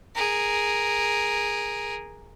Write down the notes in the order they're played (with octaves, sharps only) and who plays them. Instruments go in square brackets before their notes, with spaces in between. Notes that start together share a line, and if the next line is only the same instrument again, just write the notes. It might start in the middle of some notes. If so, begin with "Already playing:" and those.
[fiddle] G#4 A#4